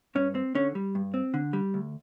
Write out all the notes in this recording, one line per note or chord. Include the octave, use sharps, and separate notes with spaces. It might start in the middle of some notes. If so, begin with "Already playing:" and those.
G2 C#4
C4
D3 C#4
G3
G2
C4
D3
G3
D2